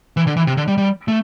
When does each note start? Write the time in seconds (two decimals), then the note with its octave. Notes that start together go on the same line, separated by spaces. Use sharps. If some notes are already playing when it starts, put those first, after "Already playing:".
0.17 E3
0.27 D3
0.37 E3
0.47 C3
0.57 D3
0.67 G3
0.78 G3
1.08 A3